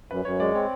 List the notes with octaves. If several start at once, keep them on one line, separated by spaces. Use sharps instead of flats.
F#2 B4
F#2 C#5
G#3 D5
C4 C#5